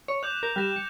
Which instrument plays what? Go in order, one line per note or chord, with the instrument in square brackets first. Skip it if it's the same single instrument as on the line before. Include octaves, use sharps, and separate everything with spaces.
[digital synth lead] C#5
[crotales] D6 G6 F7 [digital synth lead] F#6
[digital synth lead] A#4 [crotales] G6 F7
[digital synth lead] G3 [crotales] F#6 A#6 E7
[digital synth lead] C#7